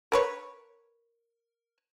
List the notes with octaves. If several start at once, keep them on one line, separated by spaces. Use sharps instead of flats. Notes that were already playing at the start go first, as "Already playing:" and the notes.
A#4 B4 C#5